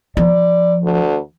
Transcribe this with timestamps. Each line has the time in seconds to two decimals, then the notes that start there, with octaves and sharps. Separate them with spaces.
0.17 F3 D5
0.83 D2